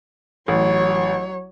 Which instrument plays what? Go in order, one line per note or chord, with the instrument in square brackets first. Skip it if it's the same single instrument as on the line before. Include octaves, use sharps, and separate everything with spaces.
[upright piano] A1 [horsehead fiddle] F#3 C#5